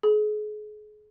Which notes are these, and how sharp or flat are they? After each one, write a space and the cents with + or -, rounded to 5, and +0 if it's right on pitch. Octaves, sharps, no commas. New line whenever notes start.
G#4 +35